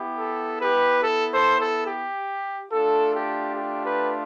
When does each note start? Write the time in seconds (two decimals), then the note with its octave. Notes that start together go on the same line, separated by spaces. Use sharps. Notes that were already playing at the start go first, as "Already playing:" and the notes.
Already playing: B3 E4 G4
0.19 A4
0.61 G4 B4
1.03 A4
1.32 A4 C5
1.60 A4
1.88 G4
2.72 A3 D4 F4 A4
3.14 G4
3.56 G4
3.85 G4 B4